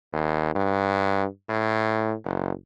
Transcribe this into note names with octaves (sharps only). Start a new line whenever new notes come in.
D#2
G2
A2
F#1